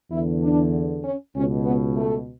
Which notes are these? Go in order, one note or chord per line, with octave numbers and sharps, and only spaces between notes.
E2 D3 E4
D4
C#4
C#2 B2 C#4
B3
A3